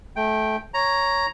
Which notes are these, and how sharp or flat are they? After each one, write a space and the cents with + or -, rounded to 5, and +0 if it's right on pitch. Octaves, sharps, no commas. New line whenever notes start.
A3 -20 G5 +0
C#5 +0 A#5 +0